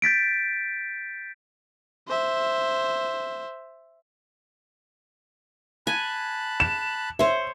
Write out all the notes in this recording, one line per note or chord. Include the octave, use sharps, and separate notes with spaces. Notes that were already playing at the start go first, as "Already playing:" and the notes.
G6 A6 B6 D7
C5 E5
G#5 A5 B5 F#6
E7
C5 C#5 E5